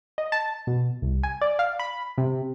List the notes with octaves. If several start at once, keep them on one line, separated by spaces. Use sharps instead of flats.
D#5
A5
B2
C2
G#5
D5
F5
B5
C3